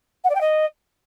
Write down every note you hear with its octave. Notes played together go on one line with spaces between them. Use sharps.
F#5
D5
G5
D#5